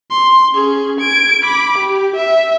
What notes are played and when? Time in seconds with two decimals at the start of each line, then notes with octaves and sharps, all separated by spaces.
0.11 C6
0.54 C#4 G#4
1.00 G#6 D7
1.45 B5 D6
1.79 G4
2.16 E5